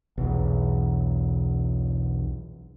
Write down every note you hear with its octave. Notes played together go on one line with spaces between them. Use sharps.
B1 E2